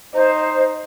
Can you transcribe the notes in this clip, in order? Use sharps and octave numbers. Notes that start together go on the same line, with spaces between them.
D#4 C5